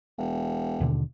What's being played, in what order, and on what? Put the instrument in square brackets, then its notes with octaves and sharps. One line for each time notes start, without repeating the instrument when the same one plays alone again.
[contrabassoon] E1
[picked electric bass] D#2 B2 D3